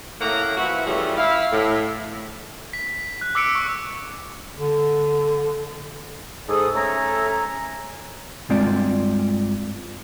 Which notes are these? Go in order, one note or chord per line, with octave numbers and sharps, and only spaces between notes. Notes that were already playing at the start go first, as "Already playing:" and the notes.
A2 A3 A#3 C#4 F#5 A#5
E3 F3 E4 F#4
E3 G3 A3 C#4 F4 G#4
E4 F5
A2
B6
F#6
D6 E6 B6 C#7 D7
C#6
D3
G#2 A4 D#6
A3 C#4 A4 E5 G#5 A#5
G2 G#3 C4 F4 D5